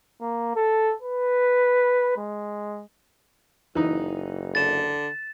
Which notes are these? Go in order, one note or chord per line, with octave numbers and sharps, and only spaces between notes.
A#3
A4
B4
G#3
F#1 E3 D#4
D3 A6 E7